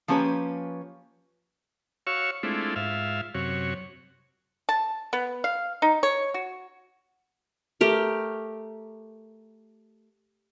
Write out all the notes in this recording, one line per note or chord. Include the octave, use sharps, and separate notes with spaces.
F3 A#3 C#4 G4 B4 C#5
F#4 C#5 F5 C#6 E6
G#3 A3 C4 D4 E4 F4
G#2 F4 E5 F5
F#2 C3 F#4 C#5
A5
B3
F5
D#4
C#5
F#4
A3 G4 A#4